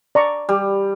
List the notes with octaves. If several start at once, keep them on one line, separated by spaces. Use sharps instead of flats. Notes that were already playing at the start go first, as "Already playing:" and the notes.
D5 A#5 C#6
G3